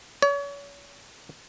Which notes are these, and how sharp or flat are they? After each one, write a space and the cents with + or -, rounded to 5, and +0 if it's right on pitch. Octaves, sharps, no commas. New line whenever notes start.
C#5 +35